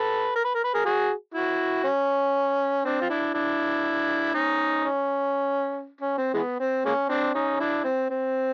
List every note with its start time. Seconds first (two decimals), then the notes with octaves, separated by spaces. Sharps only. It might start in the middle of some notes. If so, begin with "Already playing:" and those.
Already playing: A4 B4
0.35 A#4
0.44 B4
0.55 A#4
0.64 B4
0.74 G#4 A#4
0.85 F#4 G#4
1.34 E4 F#4
1.84 C#4
2.85 C4 D4
3.01 F4
3.10 D4 E4
3.34 D4 E4
4.34 C#4 D#4
4.84 C#4
6.01 C#4
6.17 C4
6.34 E3 G#3 B3
6.60 C4
6.85 G#3 A#3 C#4
7.09 C4 D4
7.34 C#4 D#4
7.60 D4 E4
7.84 C4
8.10 C4